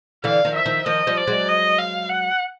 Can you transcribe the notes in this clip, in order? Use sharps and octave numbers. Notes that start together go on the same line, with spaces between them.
D3 E3 F5
D#3 F3
E5
D#3 F3
D#3 F3 D#5
F3 G3
D5
F#3 G#3
D#5
F5
F#5